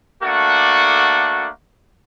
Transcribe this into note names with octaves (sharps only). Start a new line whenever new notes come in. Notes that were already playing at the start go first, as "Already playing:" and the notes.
A3 A#3 D4 F#4 A4 F#5